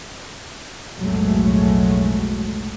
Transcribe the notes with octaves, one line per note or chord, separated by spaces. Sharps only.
F1 B1 A2 F#3 G#3 A3